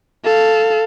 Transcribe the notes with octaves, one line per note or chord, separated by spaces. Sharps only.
A4 F5